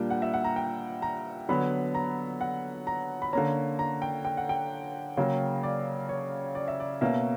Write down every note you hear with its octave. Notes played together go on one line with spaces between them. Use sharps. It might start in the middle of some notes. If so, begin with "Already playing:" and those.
Already playing: A#2 G3 A#3 D4 G5
F#5
E5
F#5
A#5
G5
A#5
D3 F#3 B3 B5
A#5
F#5
A#5
B5
D3 A#3 C#4 A#5
A#5
G5
G5
F#5
G5
C#3 F#3 A#3
D5
C#5
D5
E5
D5
B2 A#3 C#4 E5